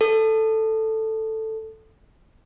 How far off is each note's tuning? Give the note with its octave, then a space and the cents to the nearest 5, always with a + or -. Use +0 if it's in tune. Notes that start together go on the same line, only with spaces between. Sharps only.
A4 +5